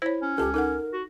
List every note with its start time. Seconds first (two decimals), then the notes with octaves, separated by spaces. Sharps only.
0.02 E4 C5 C#5
0.22 C#4
0.38 C#2 G4 A4 A5
0.54 D#4 A4 A#4 F#5
0.93 F#4